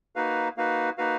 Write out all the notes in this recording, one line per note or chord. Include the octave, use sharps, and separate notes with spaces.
A#3 D#4 F#4 B4 F5
A#3 D#4 F#4 B4 F5
A#3 D#4 F#4 B4 F5